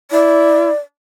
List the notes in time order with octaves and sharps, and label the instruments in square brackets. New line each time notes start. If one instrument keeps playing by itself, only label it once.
[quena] E4 [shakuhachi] D5